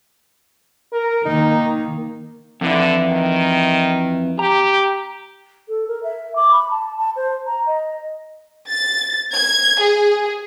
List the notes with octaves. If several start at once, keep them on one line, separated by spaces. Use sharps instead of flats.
A#4
D#3 A#3 D#4
F2 D3 E3 E4
D#3
G4 A#5
A4
A#4
E5
D6
B5
A5
A5
C5
A#5
D#5
A6
G#6
G#4